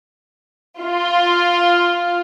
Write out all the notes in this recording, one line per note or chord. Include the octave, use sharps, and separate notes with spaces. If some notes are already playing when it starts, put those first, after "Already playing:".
F4